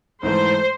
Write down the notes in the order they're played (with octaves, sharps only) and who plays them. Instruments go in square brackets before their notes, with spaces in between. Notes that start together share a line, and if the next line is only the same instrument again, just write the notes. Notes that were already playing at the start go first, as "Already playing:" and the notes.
[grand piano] G#2 E3 A3 [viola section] C5